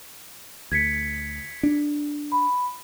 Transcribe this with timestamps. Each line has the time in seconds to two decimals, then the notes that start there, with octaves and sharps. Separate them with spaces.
0.72 D2 G#6 B6 C#7
1.63 D4
2.32 B5